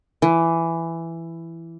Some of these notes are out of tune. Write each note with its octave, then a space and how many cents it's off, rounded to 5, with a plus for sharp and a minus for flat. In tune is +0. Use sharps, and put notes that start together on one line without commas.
E3 +10